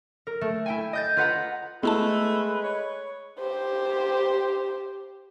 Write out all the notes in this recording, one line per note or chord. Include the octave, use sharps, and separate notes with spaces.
A#4
A3
E4 G5 G#5
D#5 G6 A6
F4 B4 F#5 A#5
G#3 A3 B3 E4 B4 A5
C#5
G4 C5